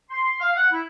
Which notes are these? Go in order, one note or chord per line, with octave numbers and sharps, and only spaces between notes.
C6
F5
F#5
E4